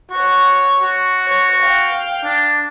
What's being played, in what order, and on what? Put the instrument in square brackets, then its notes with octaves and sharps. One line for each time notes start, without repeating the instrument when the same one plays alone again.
[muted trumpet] F#4 [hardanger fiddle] C#5 C#6
[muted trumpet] F#4
[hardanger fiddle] C#5
F5 G5
[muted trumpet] D4